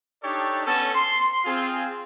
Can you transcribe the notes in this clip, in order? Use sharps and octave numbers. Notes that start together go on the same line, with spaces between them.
D4 D#4 G4 A4 C#5 D5
B3 C#4 A4
C6
C4 F4 G#4